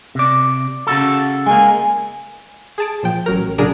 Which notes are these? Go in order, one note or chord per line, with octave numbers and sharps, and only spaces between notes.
C3 D5
C#3 F#4 A4
G#3 A#3 G#5
G#4 A5 D7
A#2 F3 G5
A1 F#3 A#4
A#2 C#3 F#3 D4 G#4 A#4